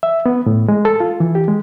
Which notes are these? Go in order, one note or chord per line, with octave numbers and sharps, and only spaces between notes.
E5
B3
A2
G#3
A4
F4
E3
G4
G#3